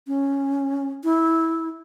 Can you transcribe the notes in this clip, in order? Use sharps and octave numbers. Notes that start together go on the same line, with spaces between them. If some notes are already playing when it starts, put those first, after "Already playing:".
C#4
E4